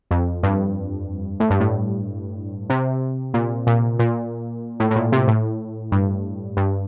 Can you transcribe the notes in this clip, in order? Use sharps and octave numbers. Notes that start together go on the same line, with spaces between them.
F2
G2
A2
G2
A2
C3
A#2
A#2
A#2
A2
A2
A#2
C3
A2
G2
G2